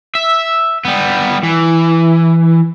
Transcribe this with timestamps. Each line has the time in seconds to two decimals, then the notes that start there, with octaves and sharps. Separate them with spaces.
0.15 E5
0.85 G3 B3
1.44 E3